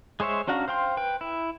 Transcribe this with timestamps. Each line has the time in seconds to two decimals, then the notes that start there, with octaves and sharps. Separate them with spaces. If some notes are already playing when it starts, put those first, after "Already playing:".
0.20 G#3 G#4 C5 C#5 E5
0.48 C#4 D4 F#4 F5 A#5
0.68 C5 F5 G5 C6
0.97 B4 G5
1.21 E4